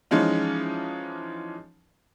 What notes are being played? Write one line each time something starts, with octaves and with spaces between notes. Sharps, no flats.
E3 F3 G#3 C#4 D#4 F4